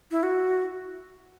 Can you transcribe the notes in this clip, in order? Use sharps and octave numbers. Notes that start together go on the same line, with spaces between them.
E4
F#4